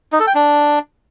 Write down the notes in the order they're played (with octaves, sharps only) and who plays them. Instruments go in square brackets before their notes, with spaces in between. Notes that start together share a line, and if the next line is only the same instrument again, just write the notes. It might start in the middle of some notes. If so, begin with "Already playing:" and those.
[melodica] D#4
A4
G5
D4